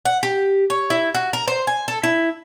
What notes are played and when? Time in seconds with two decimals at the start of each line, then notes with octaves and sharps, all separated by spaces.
0.05 F#5
0.23 G4
0.70 C#5
0.90 E4
1.15 F#4
1.33 A#4
1.48 C5
1.67 G#5
1.88 A4
2.03 E4